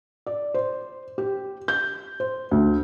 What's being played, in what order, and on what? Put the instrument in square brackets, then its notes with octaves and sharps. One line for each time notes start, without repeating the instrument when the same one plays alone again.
[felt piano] D5
C5
G4
G6
C5
D2